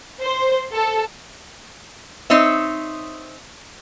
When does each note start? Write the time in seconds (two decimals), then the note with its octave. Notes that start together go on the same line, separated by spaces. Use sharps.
0.20 C5
0.73 A4
2.30 C4 D#4 C#5 E5